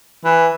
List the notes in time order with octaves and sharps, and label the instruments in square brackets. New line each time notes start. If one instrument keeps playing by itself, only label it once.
[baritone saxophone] E3